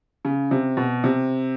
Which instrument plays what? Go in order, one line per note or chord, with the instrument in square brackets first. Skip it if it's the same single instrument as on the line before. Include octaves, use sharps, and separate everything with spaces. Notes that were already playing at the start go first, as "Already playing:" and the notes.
[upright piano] C#3
C3
B2
C3